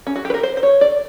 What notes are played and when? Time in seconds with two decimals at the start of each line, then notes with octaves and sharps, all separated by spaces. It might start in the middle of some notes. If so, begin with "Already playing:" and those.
0.07 C#4
0.16 F#4
0.25 G4
0.30 B4
0.34 A#4
0.43 C5
0.57 C5
0.63 C#5
0.81 D5